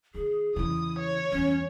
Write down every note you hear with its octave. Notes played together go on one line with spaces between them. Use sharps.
D#3 G#4
E2 C#3 E4 D#6
C#5
E2 G2 C#4